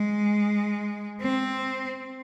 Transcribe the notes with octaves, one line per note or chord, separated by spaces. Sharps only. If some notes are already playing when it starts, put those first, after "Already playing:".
Already playing: G#3
C4